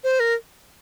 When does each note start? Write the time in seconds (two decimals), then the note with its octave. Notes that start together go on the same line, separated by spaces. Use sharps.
0.04 C5
0.20 A#4